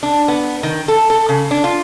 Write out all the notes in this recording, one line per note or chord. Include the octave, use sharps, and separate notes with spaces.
D4
B3
D#3
A4
A4
C#3
D4
F4